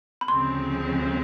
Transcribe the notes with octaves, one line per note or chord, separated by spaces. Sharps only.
B5
D2 C#3 F3 G#3 C4 C6